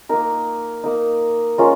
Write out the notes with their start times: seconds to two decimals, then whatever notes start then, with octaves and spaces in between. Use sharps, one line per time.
0.09 A#3 D#4 A#4
0.84 A#3 D#4
1.58 G#3 C#4 F4 A#4